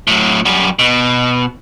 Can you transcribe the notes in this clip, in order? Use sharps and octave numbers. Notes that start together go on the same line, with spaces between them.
A2 F#3
F#2 G3
B2